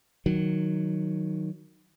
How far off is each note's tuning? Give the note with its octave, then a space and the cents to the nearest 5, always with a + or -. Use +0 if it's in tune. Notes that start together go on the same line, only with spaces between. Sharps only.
D#3 +0 F#3 +0